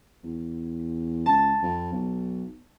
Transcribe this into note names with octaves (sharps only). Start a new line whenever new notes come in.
E2
C#2 A5
F2
B1